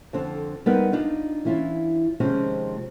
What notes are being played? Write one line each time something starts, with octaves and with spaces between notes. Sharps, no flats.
F2 D3 C4
G3 B3 C4 D#4 A#4 B4
D4 D#4 F4
E3 C#4 E4 F4
C3 D#3 F3 G#3 C4 C#4